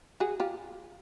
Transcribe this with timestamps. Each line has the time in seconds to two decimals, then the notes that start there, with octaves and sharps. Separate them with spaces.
0.20 F#4 G#4
0.40 F4 G4